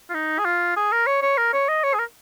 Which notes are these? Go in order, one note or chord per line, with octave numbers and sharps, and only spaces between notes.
F4
D#4
G#4
F4
G#4
A#4
C#5
C#5
A#4
C#5
D#5
C#5
G#4
A#4